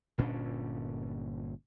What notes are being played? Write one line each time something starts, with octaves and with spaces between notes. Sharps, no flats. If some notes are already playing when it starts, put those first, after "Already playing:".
G1 A#2 C#4 D4